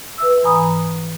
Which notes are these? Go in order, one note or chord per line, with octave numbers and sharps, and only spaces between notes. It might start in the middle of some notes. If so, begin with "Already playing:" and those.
B4 E5 E6
G#2 E3 G#5 A#5 B5 D#6